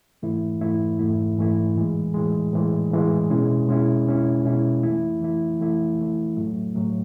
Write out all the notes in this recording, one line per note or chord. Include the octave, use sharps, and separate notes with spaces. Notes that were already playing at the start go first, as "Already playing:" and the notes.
G#2 E3 A3 E4
G#2 E3 A3 E4
G#2 E3 A3 E4
G#2 E3 A3 E4
A2 E3 G#3
A2 E3 G#3
A2 E3 G#3
A2 E3 G#3
B2 G#3 C#4 E4
B2 G#3 C#4 E4
B2 G#3 C#4 E4
B2 G#3 C#4 E4
E3 A3 E4
E3 A3 E4
E3 A3 E4
E3 A3 E4
A2 F#3 A3
A2 F#3 A3